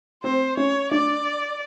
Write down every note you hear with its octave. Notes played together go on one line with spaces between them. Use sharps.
C4 C5
C#4 C#5
D4 D5